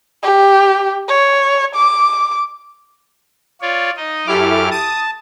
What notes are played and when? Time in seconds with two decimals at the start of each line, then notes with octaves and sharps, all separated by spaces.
0.23 G4
1.08 C#5
1.76 D6
3.61 F4 C#5 D5
3.97 D#4 D#5
4.27 F#2 E4 G4 A4 D6 F6
4.71 A5 D#6